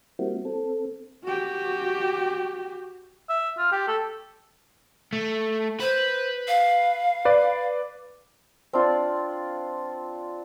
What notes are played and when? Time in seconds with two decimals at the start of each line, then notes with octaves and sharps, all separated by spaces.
0.19 G3 A#3 C4 E4 F#4
0.45 C4 A4
1.24 F#4 G4
3.29 E5
3.58 F4
3.72 G4
3.88 A4
5.13 A3
5.80 B4 C5
6.48 F5
7.25 B4 D5
8.73 C4 D4 F4 D5